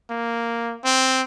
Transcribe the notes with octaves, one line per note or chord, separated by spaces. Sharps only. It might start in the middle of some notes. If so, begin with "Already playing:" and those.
A#3
C4